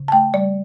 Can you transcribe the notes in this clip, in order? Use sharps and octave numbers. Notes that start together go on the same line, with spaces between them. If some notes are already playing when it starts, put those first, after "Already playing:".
Already playing: C#3
A5
A3 G5
G3 D5